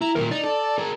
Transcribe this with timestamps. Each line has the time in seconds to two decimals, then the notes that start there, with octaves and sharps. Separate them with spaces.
0.01 E4 A#5
0.15 D#2 A#2 A#4
0.31 D#4 D5
0.44 A4
0.78 G#4 A#4